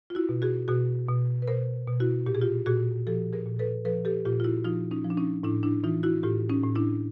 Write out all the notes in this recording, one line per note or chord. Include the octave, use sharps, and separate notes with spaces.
F4
E4 F#4
B2
F#4 G#4
B2 F#4 G#4
B2
B4
B2 A#4 C5
B2
E4 F#4
A#2 G4
G#4
F4 G4
A#2 F#4 G#4
F3 G4 A4
G#4 A#4
A#2
A4 B4
F3 A4 B4
G4 A4
A#2 F4 G4
F4
E4 F#4
F3 D#4 F4
C#4 D#4
F3
D4
C#4 D#4
A2 D4 E4
D4 E4
E3 D#4 F4
E4 F#4
A2 F4 G4
C#4 D#4
A2
D4 E4